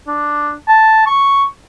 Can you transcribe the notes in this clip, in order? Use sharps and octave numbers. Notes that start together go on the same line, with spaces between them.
D4
A5
C#6